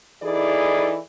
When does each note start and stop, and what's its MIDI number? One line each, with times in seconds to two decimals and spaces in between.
0.23 0.98 52
0.23 0.98 63
0.23 0.98 64
0.23 0.98 68
0.23 0.98 69
0.23 0.98 74